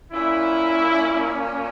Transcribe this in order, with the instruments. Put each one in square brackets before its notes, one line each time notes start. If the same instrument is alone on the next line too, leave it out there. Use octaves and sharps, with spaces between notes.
[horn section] A#2 A#3 C#4 E4